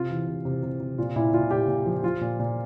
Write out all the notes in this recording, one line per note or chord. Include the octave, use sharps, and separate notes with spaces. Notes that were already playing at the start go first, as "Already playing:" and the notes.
Already playing: C3 F4
E3
C3
C3
C3
C3
A#2 F4
A#2 E4
A#2 F4
A#2 G4
A#2
F3
F3 F4
A#2
A#2